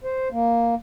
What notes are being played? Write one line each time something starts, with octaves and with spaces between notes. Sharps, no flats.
C5
A#3